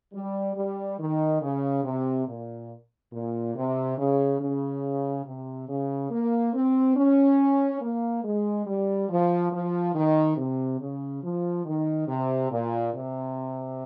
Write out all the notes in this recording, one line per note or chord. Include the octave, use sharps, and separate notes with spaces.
G3
G3
D#3
C#3
C3
A#2
A#2
C3
C#3
C#3
C3
C#3
A#3
C4
C#4
A#3
G#3
G3
F3
F3
D#3
C3
C#3
F3
D#3
C3
A#2
C3